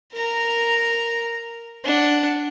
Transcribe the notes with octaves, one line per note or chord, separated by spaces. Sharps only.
A#4 A#5
D4 F#5